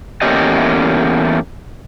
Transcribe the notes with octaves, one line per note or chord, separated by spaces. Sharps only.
E2 A3 A#3 C#4 G4 D#5